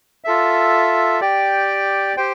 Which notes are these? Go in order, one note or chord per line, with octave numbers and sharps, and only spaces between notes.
F4 A4 E5
G4 D5 G5
G4 C5 G5